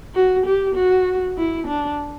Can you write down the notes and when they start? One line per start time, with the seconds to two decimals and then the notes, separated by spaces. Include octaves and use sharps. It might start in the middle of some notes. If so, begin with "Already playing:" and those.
0.15 F#4
0.46 G4
0.75 F#4
1.37 E4
1.67 D4